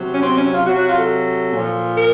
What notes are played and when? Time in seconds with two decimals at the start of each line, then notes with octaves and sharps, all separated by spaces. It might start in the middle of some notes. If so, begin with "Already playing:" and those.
Already playing: C3 F#3
0.11 C#4
0.22 C4
0.36 C#4
0.51 F4
0.65 C3 F#3 F#4
0.76 F#4
0.87 F4
0.98 A4
1.53 A#2 F3
1.96 A#4